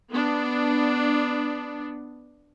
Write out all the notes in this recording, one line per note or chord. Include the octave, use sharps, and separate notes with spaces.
B3 D4